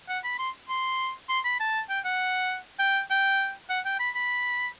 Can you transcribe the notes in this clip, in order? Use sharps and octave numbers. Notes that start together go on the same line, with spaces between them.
F#5
B5
C6
C6
C6
B5
A5
G5
F#5
G5
G5
F#5
G5
B5
B5